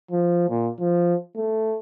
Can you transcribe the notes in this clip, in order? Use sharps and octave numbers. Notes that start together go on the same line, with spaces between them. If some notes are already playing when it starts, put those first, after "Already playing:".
F3
A#2
F3
A3